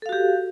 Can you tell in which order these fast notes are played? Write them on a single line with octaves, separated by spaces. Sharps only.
A4 F5 F#4 G4